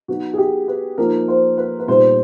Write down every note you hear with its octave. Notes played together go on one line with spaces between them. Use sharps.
F#3 B3 D#4 F#4
G#4
G4
B4
F3 A#3 D#4 A#4
C5
B4
B4
A#2 G3 B3 D#4 C5